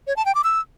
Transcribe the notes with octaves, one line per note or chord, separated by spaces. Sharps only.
C#5
A5
G5
D6
E6